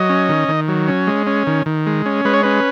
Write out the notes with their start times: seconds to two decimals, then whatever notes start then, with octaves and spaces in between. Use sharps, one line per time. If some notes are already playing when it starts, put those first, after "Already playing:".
Already playing: F#3 D#5
0.10 C#4
0.29 D#3
0.48 D#3
0.68 F#3
0.88 C#4
1.07 G#3
1.27 C#4
1.47 D#3
1.66 D#3
1.86 G#3
2.06 C#4
2.25 G#3 B4
2.34 C#5
2.43 C#4 B4